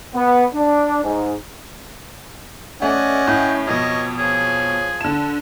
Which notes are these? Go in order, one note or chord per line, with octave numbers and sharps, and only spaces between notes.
B3
D4
G#2
A3 C#4 D5 D#5 F#5 G#5
A2 G5
F2 B2 C#5 D#5
F3 G#4 C#5
D3 A5 E7